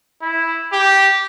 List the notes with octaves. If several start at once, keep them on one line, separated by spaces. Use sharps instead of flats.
E4
G4